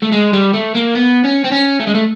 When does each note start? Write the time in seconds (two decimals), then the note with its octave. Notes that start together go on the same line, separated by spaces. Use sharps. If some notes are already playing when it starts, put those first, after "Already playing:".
0.02 A3
0.12 G#3
0.33 G3
0.54 A3
0.75 A#3
0.95 B3
1.24 C#4
1.44 C4
1.51 C#4
1.80 A3
1.87 G#3
1.95 A3